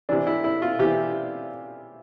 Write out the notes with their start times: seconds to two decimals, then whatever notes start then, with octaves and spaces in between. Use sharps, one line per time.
0.09 C3 E3 D4
0.27 E4
0.44 E4
0.62 F4
0.79 C3 E3 G4